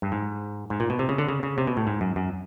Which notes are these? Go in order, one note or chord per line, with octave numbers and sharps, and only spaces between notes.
G2
G#2
G#2
A#2
B2
C3
C#3
D3
C#3
C#3
C3
B2
A2
G#2
F#2
F#2